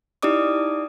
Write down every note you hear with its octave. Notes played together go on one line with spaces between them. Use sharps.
D#4 E4 G4 D5 D6 D#6